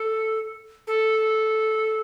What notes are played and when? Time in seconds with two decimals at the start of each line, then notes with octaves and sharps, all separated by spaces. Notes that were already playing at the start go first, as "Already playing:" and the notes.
Already playing: A4
0.87 A4